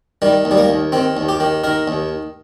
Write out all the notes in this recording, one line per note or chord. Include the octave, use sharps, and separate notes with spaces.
D#3 G3
D#2
G3
A#3
D#2
D#3 C4
D#2
G4
D#3
D#3 A#4
D#2